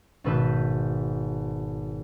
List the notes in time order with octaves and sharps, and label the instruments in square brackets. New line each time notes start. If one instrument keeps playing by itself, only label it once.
[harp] G#1 B2 G#3 B4 E6 G6